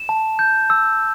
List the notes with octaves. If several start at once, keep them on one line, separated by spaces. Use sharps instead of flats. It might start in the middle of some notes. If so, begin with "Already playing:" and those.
Already playing: E7
A5
G6
E6